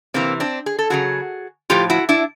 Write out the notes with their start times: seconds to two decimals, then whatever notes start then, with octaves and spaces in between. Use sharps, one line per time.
0.14 C3 E3 A#3 C4
0.40 C4 D4
0.66 G#4
0.79 A4
0.90 C#3 F#3 F#4 G#4
1.70 A2 F3 F4 G4
1.90 E4 F#4
2.09 D4 E4